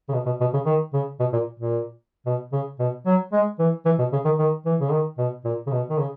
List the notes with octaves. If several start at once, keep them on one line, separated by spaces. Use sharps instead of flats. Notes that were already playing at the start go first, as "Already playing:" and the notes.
C#3
B2
B2
B2
C#3
D#3
C#3
B2
A#2
A#2
B2
C#3
B2
F#3
G#3
E3
E3
B2
C#3
D#3
D#3
E3
C#3
D#3
B2
A#2
C#3
B2
D#3
C#3